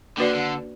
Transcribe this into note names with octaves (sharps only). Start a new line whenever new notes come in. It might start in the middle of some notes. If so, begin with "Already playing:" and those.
D3 A#3 D4 F#4 B4 D5
D3